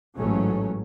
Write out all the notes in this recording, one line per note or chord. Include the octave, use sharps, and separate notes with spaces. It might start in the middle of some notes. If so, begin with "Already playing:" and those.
A1 G#2 F#3 A3 C#4